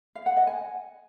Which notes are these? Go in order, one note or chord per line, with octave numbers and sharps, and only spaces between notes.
F5
F#5
D#5
G#5